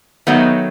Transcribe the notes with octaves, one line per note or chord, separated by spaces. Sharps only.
D#3 F#3 A3 B3 D#4